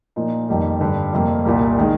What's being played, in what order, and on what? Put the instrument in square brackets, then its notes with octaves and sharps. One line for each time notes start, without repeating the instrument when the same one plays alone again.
[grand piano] A#2 F3 A#3 D#4
F2 D#3 G3 A#3 D#4
G2 D3 G3
F2 C3 G3 A#3
C2 A#2 G3 A#3
D#3 G#3